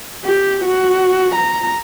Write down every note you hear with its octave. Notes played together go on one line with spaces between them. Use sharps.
G4
F#4
A#5